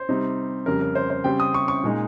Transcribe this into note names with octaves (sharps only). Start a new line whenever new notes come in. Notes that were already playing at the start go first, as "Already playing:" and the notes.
Already playing: C5
C3 G3 C4 D#4
F2 C#3 G3 A#4
A#4
C5
C5
C#3 G3 C4 G5
D#6
C#6
C#6
A#2 G#3 D#4